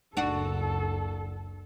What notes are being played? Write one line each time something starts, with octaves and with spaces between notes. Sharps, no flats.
F#1 C#2 D4 F#4 A4